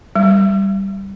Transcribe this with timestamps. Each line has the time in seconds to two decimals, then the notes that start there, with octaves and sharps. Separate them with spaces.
0.16 G3